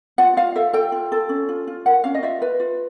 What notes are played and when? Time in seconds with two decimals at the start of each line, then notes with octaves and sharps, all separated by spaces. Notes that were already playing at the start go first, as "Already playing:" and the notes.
0.18 F4 F#5
0.37 F4 F5
0.56 A4 E5
0.73 A4 G5
0.92 F4
1.12 A4
1.29 C#4
1.49 F4
1.68 F4
1.86 A#4 F#5
2.04 C#4 F5
2.15 D#5
2.23 F4 E5
2.42 F4 B4
2.60 F4